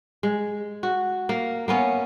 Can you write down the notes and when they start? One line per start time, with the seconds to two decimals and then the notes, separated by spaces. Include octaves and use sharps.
0.23 G#3
0.83 F#4
1.29 A#3
1.68 A#3 B3 C#4